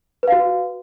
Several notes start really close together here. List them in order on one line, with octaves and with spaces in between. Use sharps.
B4 F5 F#4